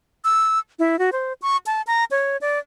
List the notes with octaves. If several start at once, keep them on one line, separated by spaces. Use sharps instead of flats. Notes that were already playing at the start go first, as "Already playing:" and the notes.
E6
E4
F#4
C5
C#6
A5
A#5
C#5
D5